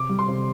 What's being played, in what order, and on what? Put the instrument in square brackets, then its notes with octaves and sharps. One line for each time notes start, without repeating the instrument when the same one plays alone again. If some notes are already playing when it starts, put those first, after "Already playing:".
Already playing: [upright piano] C3 D6
G3
C6
C3